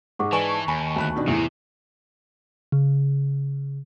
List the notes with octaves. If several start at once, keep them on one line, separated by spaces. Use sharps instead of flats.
G#2 G#3 F#5 C#6 D6
E3 B4 D5 G#5 A5 C#6
D#2 G#5 B5
D2 B5 F#6
B2 D#3 D4
E2 A2 C3 A3 E4
C#3